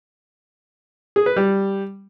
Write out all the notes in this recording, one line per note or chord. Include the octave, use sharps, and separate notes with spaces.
G#4
B4
G3